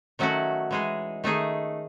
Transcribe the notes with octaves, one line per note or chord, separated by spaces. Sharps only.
D#3 F#3 A3 C#4 F#4
E3 G#3 D#4 G#4
D#3 A3 D#4 G#4